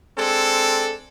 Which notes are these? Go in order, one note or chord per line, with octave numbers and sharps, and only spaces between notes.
G#3 C4 D4 A4